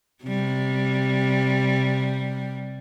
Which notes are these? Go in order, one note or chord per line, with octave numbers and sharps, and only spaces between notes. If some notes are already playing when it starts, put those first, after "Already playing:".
C3 G3